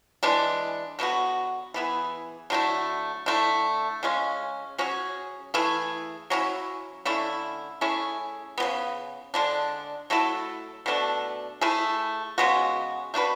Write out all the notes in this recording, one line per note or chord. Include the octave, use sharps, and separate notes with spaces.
E3 G#3 D4
D3 F#3 B3 F#4
E3 B3 E4 G#4
D3 F#3 A3 E4
D3 A3 E4
C#3 G#3 C#4
F#3 C#4 G#4
E3 A3 E4 G#4
F#3 C#4 E4
D3 A3 C#4 E4
A3 C#4 E4 G#4
C#3 F#3 B3
D3 G#3 D4
F#3 A3 E4 A4
B2 A3 D4 A4
A3 E4 G#4
C#3 G#3 B3 F#4
A3 D4 F#4 B4